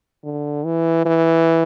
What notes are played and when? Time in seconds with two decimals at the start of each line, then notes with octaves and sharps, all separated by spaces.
0.24 D3
0.65 E3
1.06 E3